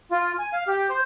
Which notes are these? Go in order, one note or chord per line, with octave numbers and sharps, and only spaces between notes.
F4
G#5
F5
G4
C5